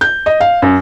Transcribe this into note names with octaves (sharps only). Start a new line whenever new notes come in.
G6
D#5
F5
F#2